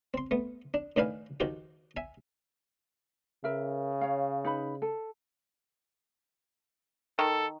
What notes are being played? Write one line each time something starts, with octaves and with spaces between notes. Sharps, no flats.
C4 C6
A3 B3
D4
A2 D#3 D4 B4 F5 G#5
D#3 F3 F#4 G4 G5
E5 G#5
C#3 A#4 B4 E5
C#5 F5
D#4 B4 B5
A4
D#3 A4